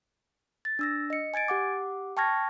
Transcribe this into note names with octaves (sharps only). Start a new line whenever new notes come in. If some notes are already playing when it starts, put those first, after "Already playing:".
A6
D4 E6 A#6
D#5 C#7
G#5 G#6 A6 D7
G4 F#5 D6
G5 A5 C#6 F6 G#6 A#6